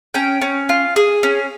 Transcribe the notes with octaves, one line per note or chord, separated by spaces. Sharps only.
C#4 G5
C#4
F4
G#4
C#4